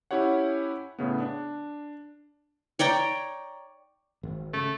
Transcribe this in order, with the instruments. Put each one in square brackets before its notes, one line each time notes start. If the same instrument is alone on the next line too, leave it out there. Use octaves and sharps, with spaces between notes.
[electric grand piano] C#4 E4 G4 C#5 F#5
A2 C#3 B3
D4
[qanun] C#5 D5 G5 A#5
[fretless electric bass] G#1
[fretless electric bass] C#3 [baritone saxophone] A3